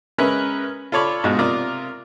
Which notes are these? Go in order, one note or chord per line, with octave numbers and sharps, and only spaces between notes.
G#3 C#4 A#4 B4 E5
F4 A4 C#5 D5 B5
G#2 B2 G#3 F4
C3 F4 A#4 D5 D#6